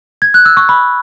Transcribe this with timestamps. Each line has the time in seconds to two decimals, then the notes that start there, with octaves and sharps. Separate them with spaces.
0.22 G#6
0.34 F#6
0.45 E6
0.57 C#6
0.69 B5